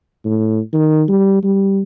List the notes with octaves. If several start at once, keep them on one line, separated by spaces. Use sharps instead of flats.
A2
D#3
G3
G3